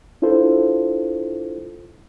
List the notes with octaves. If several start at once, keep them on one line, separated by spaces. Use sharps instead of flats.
D4 E4 F4 A4 C5